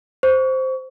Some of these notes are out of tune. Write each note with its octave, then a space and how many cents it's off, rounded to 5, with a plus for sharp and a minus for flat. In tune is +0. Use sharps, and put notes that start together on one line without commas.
C5 +0 C#6 +30